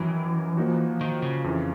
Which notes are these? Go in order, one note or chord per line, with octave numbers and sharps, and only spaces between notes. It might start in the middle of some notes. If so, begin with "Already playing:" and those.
Already playing: F#2 D#3 E3 F#3
F3 A#3 D#4 F#4
D#3
C#3
F2 C#3 E3